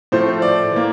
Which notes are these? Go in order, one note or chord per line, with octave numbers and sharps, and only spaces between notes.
A2 F3 A3 C5
D5
E3 A#3